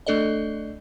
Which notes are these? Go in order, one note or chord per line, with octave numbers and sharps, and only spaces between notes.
A3 D4 A4 D5 D#5